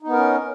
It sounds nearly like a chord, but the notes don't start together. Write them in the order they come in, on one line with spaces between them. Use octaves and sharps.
D#4 B3 A#4 C#4